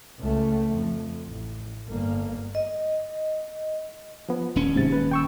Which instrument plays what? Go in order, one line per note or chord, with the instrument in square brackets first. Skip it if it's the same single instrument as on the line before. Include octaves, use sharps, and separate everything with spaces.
[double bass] C#2 A3
F2
A1
G1 A#3
[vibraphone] D#5
[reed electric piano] F3 B3
[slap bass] D#1 C#4
[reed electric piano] G#2 C3 A6
B4
G5 C#6 E6